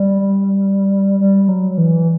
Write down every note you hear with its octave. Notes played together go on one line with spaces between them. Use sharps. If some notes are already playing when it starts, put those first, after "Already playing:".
Already playing: G3
G3
F#3
E3